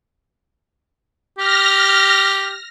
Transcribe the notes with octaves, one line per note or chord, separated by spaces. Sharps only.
G4 F6 A#6